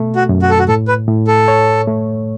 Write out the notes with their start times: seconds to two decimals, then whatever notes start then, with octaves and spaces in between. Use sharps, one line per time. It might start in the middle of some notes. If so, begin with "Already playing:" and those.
Already playing: B2 A3
0.16 F#4
0.29 F#2
0.42 F#4
0.50 A4
0.59 F#4
0.68 A2 A4
0.88 B4
1.08 A2
1.27 A4
1.48 C#5
1.88 A3